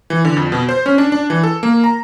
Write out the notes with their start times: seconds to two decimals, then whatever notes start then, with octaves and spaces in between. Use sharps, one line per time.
0.10 E3
0.25 D3
0.37 F2
0.52 B2
0.69 C5
0.86 C#4
0.98 D4
1.12 D4
1.30 E3
1.43 A4
1.63 A#3
1.84 A#5